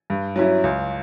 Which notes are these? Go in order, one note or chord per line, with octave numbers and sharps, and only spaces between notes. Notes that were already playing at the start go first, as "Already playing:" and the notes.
G2
F#3 C#4 E4
C#2